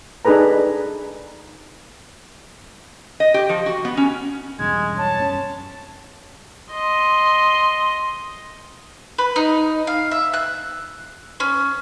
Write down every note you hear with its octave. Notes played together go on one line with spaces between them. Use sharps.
D4 D#4 G#4 A4 B4 A#5
D#5
G4
F3
F#4
B3
C#4
B1 E2 G2 G#3 G#6
C#5 A5
F#2 B3 C#4
D#5 C6
B4
D#4
F5
E5
F#6
C#4